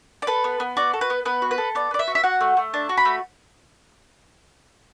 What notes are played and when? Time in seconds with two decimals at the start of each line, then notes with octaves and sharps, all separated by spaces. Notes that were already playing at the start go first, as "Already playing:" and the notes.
0.22 D5
0.27 A4 B4
0.44 B3
0.60 B3
0.77 F#4 D5
0.94 A4
1.01 B4
1.10 B3
1.25 B3 B4
1.42 F#4
1.51 B4
1.58 A4
1.75 B3 D5
1.91 B3 D5
1.99 E5
2.08 F#4
2.15 E5
2.23 F#4 F#5
2.41 A3
2.57 A3
2.74 D4 A5
2.89 F#4
2.97 B5
3.05 A3